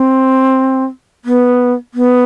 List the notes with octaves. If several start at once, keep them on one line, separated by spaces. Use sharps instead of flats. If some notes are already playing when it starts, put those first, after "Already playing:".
Already playing: C4
B3
B3